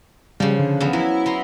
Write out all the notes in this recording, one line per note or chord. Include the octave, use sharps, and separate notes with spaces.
C#3 F3 G3
D3
E2 F3 B3
F#3 E4
B3 A#5 C6